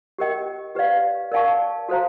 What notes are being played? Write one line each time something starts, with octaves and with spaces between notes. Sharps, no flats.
G4 A#4 D#5 G5
G4 B4 D5 F5
A#4 D5 F5 A5 C#6
F#4 A4 C5 F5 A#5